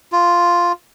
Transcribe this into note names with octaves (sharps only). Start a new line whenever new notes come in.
F4